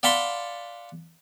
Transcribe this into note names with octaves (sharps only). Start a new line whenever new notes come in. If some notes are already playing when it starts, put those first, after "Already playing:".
D5 F5 F#5 A5 B5 C6